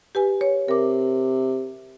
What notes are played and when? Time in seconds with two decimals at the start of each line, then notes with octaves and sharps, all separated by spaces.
0.15 G4 B4 G#5
0.41 C#5
0.68 C3 A#4 D6